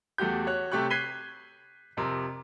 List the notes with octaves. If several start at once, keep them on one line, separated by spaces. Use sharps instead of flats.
E2 A3 F#4 G4 G6
F#4 C#5 F#6
C3 A3 G4 C#6 F#6
F#6 G#6 B6 C7 D#7 G7
F2 C3 A#4 C6